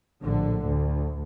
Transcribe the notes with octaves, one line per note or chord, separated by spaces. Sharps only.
A#1 A2 D3
D2